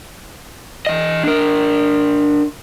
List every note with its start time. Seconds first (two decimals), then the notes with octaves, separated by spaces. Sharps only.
0.86 E3 D#5
1.23 D4 A#4